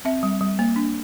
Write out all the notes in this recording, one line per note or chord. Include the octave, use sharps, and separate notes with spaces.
C4 E5
G3
G3
A#3
D4